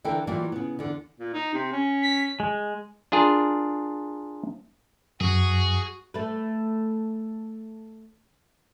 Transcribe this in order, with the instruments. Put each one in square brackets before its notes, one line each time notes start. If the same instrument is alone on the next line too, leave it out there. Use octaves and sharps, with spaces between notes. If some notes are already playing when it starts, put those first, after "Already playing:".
[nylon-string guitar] D3 E3 E4 A4 A#4 G5
E3 F#3 G3 A#3 F4
C#3 B3
E2 D3
[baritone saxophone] A#2
D#4
C3
C#4
[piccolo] B6
[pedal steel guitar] G#3
[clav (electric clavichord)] D4 F4 G#4 A#4
[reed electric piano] F#2 [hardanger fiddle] F#4 [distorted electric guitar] G#4
[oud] A3 B4